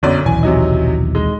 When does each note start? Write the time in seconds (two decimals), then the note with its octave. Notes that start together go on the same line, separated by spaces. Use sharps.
0.03 B1 F#2 D3 D5
0.26 D#1 B1 E3 G#5
0.43 C3 F#3 D#4
1.15 G#3 D#4